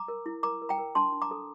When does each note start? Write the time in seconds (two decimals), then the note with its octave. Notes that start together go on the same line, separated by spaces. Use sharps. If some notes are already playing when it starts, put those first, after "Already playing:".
Already playing: A#5 D6
0.08 A#4
0.26 E4
0.43 A#4 A#5 D6
0.62 A#4
0.69 G5 A#5
0.78 A#4
0.95 D4 A5 C6
1.13 D4
1.22 A#5 D6
1.31 A4